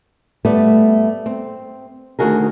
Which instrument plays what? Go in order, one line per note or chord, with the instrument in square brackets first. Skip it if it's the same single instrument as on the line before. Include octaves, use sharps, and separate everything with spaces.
[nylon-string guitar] G3 A3 B3 D5
C4
D2 B2 D#3 F#4 G#4 A#4